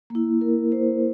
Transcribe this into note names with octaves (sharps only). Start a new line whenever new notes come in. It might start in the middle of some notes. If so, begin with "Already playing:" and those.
A#3 E4
A#4
C5